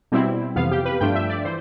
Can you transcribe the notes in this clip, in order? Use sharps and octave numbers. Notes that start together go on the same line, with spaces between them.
B2 G3 C4 E4
F2 C3 E3 B3 F5
G4
B4
G2 F3 A3 D4 F4 G5
E5
D5
E3 C5